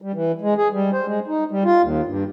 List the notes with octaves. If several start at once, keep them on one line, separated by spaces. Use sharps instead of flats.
G3
E3
G#3
G#4
G3
C5
G#3
D#4
G3
F4
D#2
G2